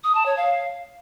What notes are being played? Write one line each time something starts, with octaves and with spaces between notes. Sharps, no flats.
D#6
A5
C#5
F5